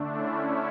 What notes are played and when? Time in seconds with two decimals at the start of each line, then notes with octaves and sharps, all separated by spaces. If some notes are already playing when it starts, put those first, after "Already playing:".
Already playing: D3 A3 D4
0.12 C#4 E4